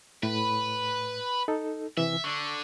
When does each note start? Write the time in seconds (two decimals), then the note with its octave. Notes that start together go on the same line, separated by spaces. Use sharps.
0.23 A2 B4
1.48 D#4 A4
1.97 C3 E3 E5
2.24 D3 C#6